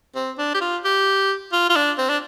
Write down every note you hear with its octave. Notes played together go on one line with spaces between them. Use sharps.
C4
D4
G4
F4
G4
F4
F4
D4
C4
D4